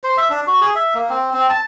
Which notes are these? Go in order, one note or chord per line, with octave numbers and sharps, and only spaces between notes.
C5
E5
D4
F#4
G#4
E5
A#3
C4
C4
A5